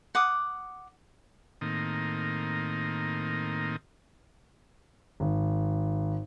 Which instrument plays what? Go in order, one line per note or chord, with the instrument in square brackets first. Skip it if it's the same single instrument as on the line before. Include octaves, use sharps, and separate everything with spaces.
[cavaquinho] F#5 D6 D#6
[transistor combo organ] A2 D#3 A#3 C4 D#4
[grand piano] G#1